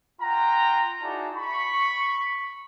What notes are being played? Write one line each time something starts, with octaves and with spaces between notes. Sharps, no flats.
F4 F#5 G5 A#5
D#4 E4 F#4 G#4 D5 A5
B5 C#6